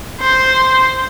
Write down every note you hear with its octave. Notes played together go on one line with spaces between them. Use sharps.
C5